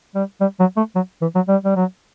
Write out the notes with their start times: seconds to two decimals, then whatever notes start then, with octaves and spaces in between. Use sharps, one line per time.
0.15 G3
0.41 G3
0.60 F#3
0.77 A3
0.96 F#3
1.22 E3
1.35 F#3
1.48 G3
1.65 G3
1.76 F#3